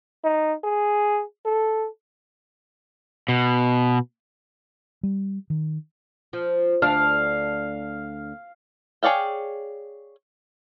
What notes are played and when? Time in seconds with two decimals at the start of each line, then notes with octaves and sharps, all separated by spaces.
0.24 D#4
0.64 G#4
1.45 A4
3.28 B2
5.03 G3
5.50 D#3
6.33 F3
6.82 D2 D4 F5
9.03 G#4 C#5 D5 F5 G5